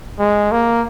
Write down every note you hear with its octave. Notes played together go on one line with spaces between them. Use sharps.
G#3
A#3